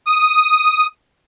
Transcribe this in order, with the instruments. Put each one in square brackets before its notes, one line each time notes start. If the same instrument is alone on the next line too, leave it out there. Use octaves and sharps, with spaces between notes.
[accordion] D#6